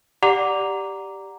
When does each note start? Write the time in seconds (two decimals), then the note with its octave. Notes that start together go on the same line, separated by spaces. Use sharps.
0.23 G4 D5 F#5 A#5 D6 F7